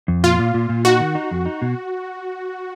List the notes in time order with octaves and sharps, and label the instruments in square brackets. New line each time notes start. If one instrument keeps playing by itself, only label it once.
[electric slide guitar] F2
[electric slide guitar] A#2 [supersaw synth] F4
[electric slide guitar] A#2
A#2
A#2
[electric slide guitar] D#4 [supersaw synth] F#4
[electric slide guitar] D#3
D#4
F2
D#4
B2